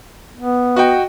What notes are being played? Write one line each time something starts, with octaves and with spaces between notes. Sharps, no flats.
B3
F#4 D#5 G5